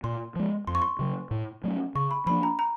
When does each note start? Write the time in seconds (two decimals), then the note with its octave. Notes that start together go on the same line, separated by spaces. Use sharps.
0.04 A#2 C6
0.36 F3 G#3
0.67 F2 C6
0.75 C#6
0.82 C6
0.99 C#3 F#3
1.31 A2
1.64 F#3 A3 C#4
1.95 C#3 C#6
2.11 B5
2.26 F3 A#3 D4 B5
2.43 A#5
2.59 A#5